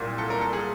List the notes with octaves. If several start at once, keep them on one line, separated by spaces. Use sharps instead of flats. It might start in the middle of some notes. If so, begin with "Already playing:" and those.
Already playing: C2 A#2 F#3
A4
A#4
A4
G#4